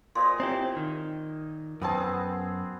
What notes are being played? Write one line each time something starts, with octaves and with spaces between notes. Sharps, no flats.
A#2 G#4 C5 D#5 C6
C4 E4 G4 C#5 A#5
D#3
F#2 B3 C4 G#4 A5